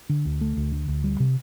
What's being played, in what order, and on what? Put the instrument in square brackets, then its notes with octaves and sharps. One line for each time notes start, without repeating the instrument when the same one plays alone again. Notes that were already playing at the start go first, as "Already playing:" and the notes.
[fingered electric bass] D3
D2
A3
D2
D3
D2
G3
C3